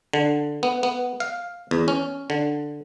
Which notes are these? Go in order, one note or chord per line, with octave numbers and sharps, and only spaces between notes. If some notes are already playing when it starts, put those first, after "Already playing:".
D3
B3
B3
F5
E2
C#4
D3